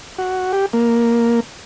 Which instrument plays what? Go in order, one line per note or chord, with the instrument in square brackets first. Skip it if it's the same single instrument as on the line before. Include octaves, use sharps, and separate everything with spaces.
[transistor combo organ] F#4
G4
A#3